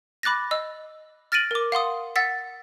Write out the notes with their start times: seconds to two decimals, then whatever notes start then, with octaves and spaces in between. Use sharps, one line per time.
0.23 B5 D6 F#6 A6 A#6
0.51 D#5 E6
1.32 F6 A6 A#6 D7 D#7 F#7
1.51 A#4 D6
1.72 F5 F#5 C6 D#6
2.16 F#5 E6 A6 B6